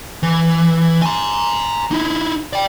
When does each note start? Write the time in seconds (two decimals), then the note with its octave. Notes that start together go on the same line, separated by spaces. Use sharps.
0.23 E3
1.02 G#5 A#5
1.92 D#4 E4
2.53 D5 G5